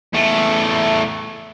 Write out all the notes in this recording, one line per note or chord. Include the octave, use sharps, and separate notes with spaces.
E2 A3